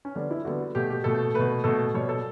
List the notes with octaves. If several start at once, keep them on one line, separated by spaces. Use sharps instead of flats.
C#4
D3 G3 B3 D4
E4
D3 G3 B3 F#4
B2 A3 G4
G4
B2 A3 A4
B2 A3 B4
B2 A3 A4
B2 G3 B3 C#5
A4